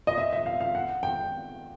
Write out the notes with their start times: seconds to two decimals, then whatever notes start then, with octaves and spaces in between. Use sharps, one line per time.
0.07 D#5
0.18 E5
0.33 E5
0.46 F5
0.60 F5
0.75 F#5
1.03 G5